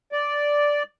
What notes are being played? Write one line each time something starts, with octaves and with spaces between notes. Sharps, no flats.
D5